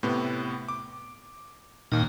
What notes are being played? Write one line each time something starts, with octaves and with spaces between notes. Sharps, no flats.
A2 C3 B3
D6
D#2 A#2 D#3 D#4